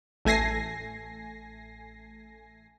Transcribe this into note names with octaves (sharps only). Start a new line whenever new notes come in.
A1 A3 G#5 A#6 C7